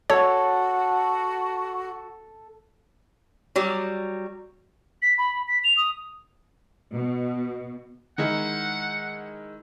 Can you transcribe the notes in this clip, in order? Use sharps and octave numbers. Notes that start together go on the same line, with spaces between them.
F#4 A4 C#5
F#3 G3
B6
B5
B6
F7
D#6
B2
D#3 G#3 E4 F#5